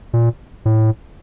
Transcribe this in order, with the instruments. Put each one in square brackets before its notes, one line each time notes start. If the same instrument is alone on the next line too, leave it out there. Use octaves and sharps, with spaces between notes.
[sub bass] A#2
A2